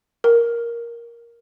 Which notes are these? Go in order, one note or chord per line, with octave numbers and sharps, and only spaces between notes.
A#4